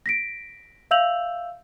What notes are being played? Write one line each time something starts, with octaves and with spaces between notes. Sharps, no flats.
A#6 B6 D7
E5 F5 E6 G6 F7 F#7